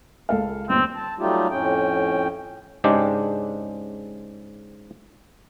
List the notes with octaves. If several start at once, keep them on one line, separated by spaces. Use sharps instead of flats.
C#2 A4 F5
G1 D#2 C4
A5
F#3 G3 A3 D#4 F4 G4
F2 A2 C#4 G5
G#2 C#3 G#3 D4 G4